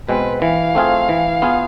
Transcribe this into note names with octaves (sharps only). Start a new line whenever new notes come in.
B2 G#3 C4 B4
E3 F5
A3 C4 F4 G#4
E3
B3 F4 G#4